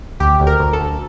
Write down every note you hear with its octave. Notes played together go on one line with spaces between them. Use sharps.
D2 G4
D2
A#4
D2
A4
D2